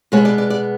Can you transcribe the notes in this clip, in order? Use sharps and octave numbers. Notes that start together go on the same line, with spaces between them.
B2 G#3 B3 C#5
D5
D5
D5